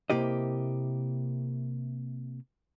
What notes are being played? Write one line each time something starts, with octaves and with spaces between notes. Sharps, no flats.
C3 A#3 E4 G4 D#5